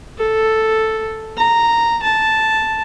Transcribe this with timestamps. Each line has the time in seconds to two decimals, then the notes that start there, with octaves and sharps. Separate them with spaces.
0.18 A4
1.38 A#5
2.03 A5